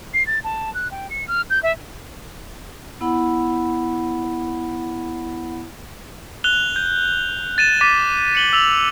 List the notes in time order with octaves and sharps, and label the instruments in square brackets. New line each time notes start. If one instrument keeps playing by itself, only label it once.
[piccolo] C7
A6
A5
F#6
G5
C#7
F6
G6
E5
[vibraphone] B3 E4 F#5 B5
[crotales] F#6 F7 G7
G6
A6 D#7 E7
D6 A6 B6 D#7 E7
C#7 F#7 G7
E6 F7 F#7